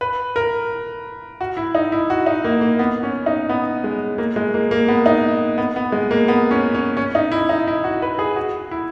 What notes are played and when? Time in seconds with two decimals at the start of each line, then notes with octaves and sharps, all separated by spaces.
0.01 B4
0.36 A#4
1.41 F#4
1.57 E4
1.75 D#4
1.92 E4
2.10 F#4
2.26 D#4
2.44 A#3
2.61 A#3
2.79 B3
3.03 C#4
3.26 D#4
3.49 B3
3.84 G#3
4.18 A#3
4.36 G#3
4.54 A#3
4.71 A#3
4.88 B3
5.06 D#4
5.58 B3
5.76 B3
5.92 G#3
6.11 A#3
6.28 B3
6.51 C#4
6.74 C#4
6.97 C#4
7.15 D#4
7.32 E4
7.49 D#4
7.68 E4
7.84 F#4
8.02 B4
8.19 G#4
8.36 F#4
8.71 E4